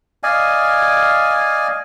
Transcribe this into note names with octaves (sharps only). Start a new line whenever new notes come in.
D5 D#5 F5 G#5